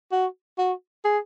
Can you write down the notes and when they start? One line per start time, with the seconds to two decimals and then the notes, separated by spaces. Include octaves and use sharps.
0.12 F#4
0.58 F#4
1.05 G#4